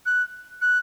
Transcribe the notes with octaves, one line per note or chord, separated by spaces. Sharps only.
F#6
F#6